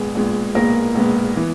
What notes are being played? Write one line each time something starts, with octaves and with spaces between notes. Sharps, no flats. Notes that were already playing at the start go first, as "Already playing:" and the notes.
Already playing: A#1 A#2 G#3 B3 G#4
A#1 A#2 G#3 B3
A#1 A#2 G#3 A#3 B3 A#4
A#1 A#2 G#3 B3
E3 B3